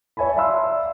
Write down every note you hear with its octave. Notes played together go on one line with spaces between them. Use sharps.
C#5 E5 G#5 A5 B5
D5 E5 F5 B5 C6 E6